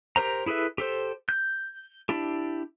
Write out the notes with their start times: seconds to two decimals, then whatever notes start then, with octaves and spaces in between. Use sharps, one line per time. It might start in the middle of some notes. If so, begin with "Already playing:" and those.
0.16 G4 A#4 C5 A#5
0.46 E4 G#4 A4 B4 E5
0.78 G4 A4 C5
1.29 G6
2.09 D4 E4 G4